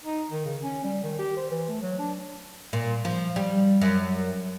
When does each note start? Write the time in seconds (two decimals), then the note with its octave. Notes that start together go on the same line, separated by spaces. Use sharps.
0.04 D#4
0.31 D#3
0.45 C#3
0.62 C#4
0.84 G3
1.03 D#3
1.19 G4
1.37 C5
1.51 E3
1.68 A3
1.82 F#3
1.99 D4
2.73 A#2
3.05 F3
3.36 G3
3.82 F#2